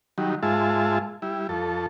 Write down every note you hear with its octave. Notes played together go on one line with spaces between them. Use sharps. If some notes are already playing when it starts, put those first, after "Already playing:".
D#3 F#3 G3
G#2 G#3 F4 E5 A5
G3 E4
F2 A4